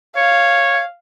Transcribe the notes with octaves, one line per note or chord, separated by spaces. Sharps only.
C#5 F5